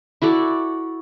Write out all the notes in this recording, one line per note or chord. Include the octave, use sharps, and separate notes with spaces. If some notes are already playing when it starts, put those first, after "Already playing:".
E4 F#4 A4 D5